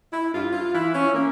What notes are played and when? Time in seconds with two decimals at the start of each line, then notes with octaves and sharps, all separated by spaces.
0.12 E4
0.33 G2 F4
0.53 F4
0.73 E3 E4
0.94 C#4
1.14 A#3